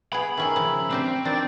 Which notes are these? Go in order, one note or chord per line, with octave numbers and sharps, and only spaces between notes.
B3 G#4 B5
D#3 C#4 G#4 A#4 E5
C#3 F3
C4 D4 G4 C5
D#3 F3 D4 D5 G5